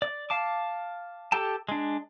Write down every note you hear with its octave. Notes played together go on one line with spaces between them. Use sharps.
D5
F5 A5 D6
G4 A4 G5 A5
G#3 D4